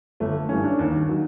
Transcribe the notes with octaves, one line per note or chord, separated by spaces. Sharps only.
G1 A3
G2 E3 C#4
D4
D#2
D#3 F#3